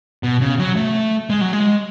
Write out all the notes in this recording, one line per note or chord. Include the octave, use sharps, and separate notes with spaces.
B2
C#3
F#3
A3
G#3
F#3
G#3